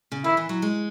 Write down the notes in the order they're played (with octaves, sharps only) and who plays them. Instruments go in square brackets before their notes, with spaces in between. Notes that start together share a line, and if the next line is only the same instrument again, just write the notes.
[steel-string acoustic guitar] C#3
[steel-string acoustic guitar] D#3 [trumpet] E4
[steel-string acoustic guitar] E3
F#3
G#3